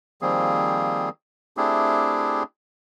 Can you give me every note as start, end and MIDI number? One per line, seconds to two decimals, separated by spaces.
0.22 1.09 51
0.22 1.09 53
0.22 1.09 55
0.22 1.09 58
0.22 1.09 60
0.22 1.09 68
1.57 2.43 57
1.57 2.43 60
1.57 2.43 62
1.57 2.43 64
1.57 2.43 67
1.57 2.43 68